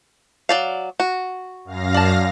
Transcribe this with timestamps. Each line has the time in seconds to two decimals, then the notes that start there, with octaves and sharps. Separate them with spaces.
0.49 F#3 D5 F5
1.00 F#4
1.65 F#2 F5 A#6
1.94 D5 A5